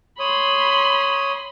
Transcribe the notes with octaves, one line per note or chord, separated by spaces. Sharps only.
C#5 B5 C6 D#6